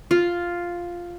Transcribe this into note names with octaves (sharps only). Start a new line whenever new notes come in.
F4